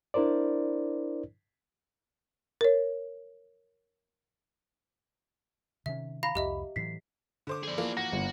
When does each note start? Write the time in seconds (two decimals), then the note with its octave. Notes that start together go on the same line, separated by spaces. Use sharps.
0.14 D4 E4 A#4 C5 D5
2.61 A#4 C#5
5.86 C3 D#3 C#4 E5
6.23 F5 A#5 B5 A#6
6.35 C2 F2 G4 D#5 E5
6.76 A2 E3 F#3 B6 C7
7.47 D3 C5 D6
7.63 G#4 D5
7.78 E3 F3 A#3
7.97 F#4 A#6
8.12 G1